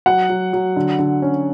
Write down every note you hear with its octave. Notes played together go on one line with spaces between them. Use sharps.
F#3 F#5
F#3
F#3
D3
D3
C#4